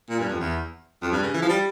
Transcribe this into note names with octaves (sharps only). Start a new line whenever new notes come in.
A#2
G2
F2
E2
F2
G2
C#3
E3
F3
G3